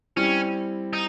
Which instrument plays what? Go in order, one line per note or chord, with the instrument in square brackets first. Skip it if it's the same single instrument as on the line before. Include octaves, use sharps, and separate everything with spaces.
[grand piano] G3 C4 E4 [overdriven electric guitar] C#4
[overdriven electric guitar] D#4